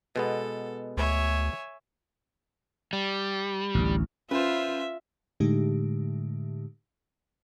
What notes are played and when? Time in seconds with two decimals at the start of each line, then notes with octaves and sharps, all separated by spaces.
0.16 B2 G#3 B3 A4
0.97 D2 C#5 E5 G#5
2.93 G3
3.75 A1 D2
4.31 C#4 F4 B4 C5 E5
5.40 A2 D3 G#3 A3 D#4 G4